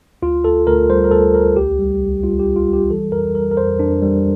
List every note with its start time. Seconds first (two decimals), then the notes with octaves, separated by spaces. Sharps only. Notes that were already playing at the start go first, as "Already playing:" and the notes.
0.22 D2 F4
0.44 D2 A4
0.67 D2 A#4
0.90 G3 C5
1.04 A#4
1.11 D2 A4
1.34 D2 A#4
1.56 C2 G4
1.79 G3
2.01 C2
2.23 G3 F4
2.39 G4
2.45 C2
2.56 F4
2.68 G3
2.73 G4
2.90 E3 A4
3.12 F2 A#4
3.35 G3 A#4
3.51 A#4
3.57 F2 C5
3.79 F2 D4
4.02 G3